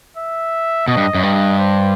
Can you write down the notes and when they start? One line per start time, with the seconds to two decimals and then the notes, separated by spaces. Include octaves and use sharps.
0.17 E5
0.88 B2 D#5
0.97 G2
1.14 F#2
1.23 G2 D#5
1.59 C5